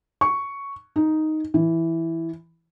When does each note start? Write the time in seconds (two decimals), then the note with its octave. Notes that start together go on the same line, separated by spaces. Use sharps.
0.21 C#6
0.96 D#4
1.54 E3